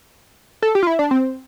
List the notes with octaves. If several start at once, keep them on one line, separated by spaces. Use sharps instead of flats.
A4
G4
F4
E4
D4
C4